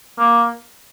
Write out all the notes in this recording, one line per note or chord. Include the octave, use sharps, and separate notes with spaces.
A#3